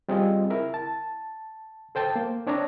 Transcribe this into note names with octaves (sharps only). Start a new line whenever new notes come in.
G3 C4 F4 G#4 D#5
E4 A#4 E5
A5
A4 C5 G5 A5
A#3
C4 D4 C#5 A#5